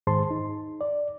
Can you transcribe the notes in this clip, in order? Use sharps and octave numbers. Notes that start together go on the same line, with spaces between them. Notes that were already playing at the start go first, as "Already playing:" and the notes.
G#2 D#3 G#4 C5 A5 C6
D#4
D5